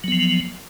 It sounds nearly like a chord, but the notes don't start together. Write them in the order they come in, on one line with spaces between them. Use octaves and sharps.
F#3 B3 F3